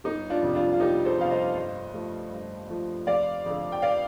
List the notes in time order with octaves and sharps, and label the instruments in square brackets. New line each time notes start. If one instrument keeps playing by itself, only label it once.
[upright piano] G1 D#4
D4 F4
F2 C3 G3
D4 F4
F4
G1 D#4 G4
A4 C5
F2 C3 G3 F5
C5 D#5
G2
F3 A3
G2
F3 A3
F1 D5 F5
F2 D3
G5
D5 F5